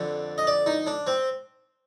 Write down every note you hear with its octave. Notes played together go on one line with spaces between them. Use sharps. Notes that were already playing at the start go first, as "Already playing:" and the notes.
Already playing: F2 D3 D5
D#5
D5
D#4
D4
C4